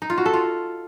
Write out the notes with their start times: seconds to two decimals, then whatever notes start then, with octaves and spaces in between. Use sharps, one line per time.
0.02 D#4
0.10 F4
0.18 F#4
0.26 A4
0.33 F4